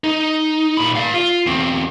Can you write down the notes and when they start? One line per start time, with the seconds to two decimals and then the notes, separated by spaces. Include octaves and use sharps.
0.04 D#4
0.77 A#2 B5
0.96 D5 F5
1.14 F4
1.46 E2 C4